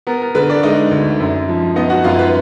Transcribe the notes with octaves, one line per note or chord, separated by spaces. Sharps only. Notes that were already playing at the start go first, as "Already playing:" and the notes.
B3 A#4
A#4
D3 B4
D4 D5
G#3 D#4 D#5
D2
F#2
F3
B3 D#4 D#5
F#4 F#5
F#2 F4 F5
B4